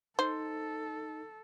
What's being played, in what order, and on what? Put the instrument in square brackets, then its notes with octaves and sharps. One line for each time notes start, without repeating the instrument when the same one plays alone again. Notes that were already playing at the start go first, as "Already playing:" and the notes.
[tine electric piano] D#4 [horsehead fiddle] A4 [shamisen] C5